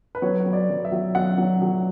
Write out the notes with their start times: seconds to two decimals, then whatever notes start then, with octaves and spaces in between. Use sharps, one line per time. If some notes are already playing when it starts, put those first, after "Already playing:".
0.15 B4
0.22 F#3 C#5
0.46 F#3
0.53 D5
0.69 F#3
0.85 E5
0.92 F#3
1.15 F#3 F#5
1.38 F#3
1.62 F#3